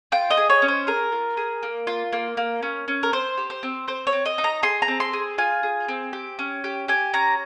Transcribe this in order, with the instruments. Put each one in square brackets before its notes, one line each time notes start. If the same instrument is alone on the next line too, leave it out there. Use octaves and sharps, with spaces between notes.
[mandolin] F4 G5
D#5
G#4
C#5
C#4
C5
G#4 A#4
F4
G#4
A#3
F4
A#3
A#3
C#4
C#4
A#4
C4 C5
G4
C5
C4
C4 C5
C#5
C4
D#5
D#4
A#5
G#4 C6
A#5
C4
C6
G#4
F4 G#5
G#4
C4
G4
C#4
G4
G4 G#5
C#4 A#5